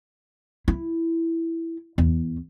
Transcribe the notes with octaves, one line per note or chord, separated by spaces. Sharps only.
E4
E2